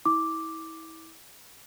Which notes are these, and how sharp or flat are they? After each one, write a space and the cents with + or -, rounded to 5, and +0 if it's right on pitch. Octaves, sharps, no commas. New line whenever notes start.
E4 -30 D6 +0